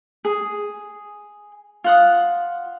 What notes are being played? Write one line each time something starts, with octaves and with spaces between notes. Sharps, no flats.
G#4
F4 F#5 D#6